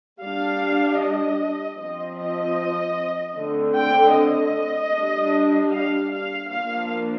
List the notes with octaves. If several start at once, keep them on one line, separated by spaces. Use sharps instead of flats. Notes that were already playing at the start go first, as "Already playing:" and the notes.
G3 D4 F5
D#5
F3 C4 D#5
D#5
D3 A3 C4
G5
D#5
G3 D4
F5
F5
F3 A#3 D4 F5